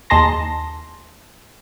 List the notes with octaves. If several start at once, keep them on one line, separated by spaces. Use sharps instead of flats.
D#2 D#4 G#4 A5 C6 A#6